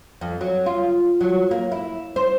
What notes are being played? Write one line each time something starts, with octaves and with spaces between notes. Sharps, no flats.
F2
F#3
F4
F#3
A#3
E4
C5